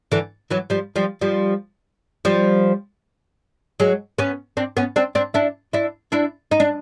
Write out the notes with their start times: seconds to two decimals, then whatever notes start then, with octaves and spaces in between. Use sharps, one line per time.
0.12 D3 E3
0.50 E3 F#3
0.70 F3 G3
0.96 F3 G3
1.21 F3 G3
2.25 F3 G3
3.80 F#3 G#3
4.18 B3 C#4
4.57 C4 D4
4.77 B3 C#4
4.96 C4 D4
5.15 C4 D4
5.34 D4 E4
5.73 D4 E4
6.12 D4 E4
6.51 D#4
6.60 D4